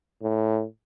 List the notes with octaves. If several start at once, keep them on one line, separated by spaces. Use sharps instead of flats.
A2